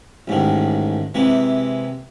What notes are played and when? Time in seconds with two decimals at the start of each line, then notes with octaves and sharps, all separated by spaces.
0.28 A1 G#2 D#3
1.14 C3 E3 G#3